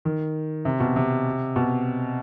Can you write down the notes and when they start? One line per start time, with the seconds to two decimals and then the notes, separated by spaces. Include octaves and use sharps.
0.05 D#3
0.65 C3
0.80 B2
0.96 C3
1.56 B2